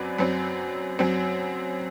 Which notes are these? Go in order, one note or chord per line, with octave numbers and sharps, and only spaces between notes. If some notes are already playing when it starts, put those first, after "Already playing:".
Already playing: F#2 F#3 C4 B4 D5
F#2 F#3 C4
F#2 F#3 C4